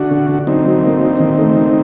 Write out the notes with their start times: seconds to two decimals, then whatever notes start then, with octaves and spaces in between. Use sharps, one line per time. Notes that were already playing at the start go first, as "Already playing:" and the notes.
Already playing: D3 D4 F#4
0.10 D3
0.28 D3
0.47 F#3 C4 D#4
0.65 F#3
0.84 A#3
1.02 D4
1.19 D#3
1.38 A3
1.57 D#3